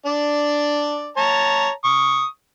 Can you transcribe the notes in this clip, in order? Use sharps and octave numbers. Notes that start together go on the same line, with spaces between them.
D4 D5
C#5 A5 A#5
C#6 D#6